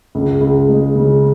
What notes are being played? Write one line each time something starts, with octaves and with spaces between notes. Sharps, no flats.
C#2
C#2
G#3
C#3